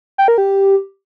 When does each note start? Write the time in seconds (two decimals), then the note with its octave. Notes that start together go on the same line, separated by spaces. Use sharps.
0.18 G5
0.28 A#4
0.38 G4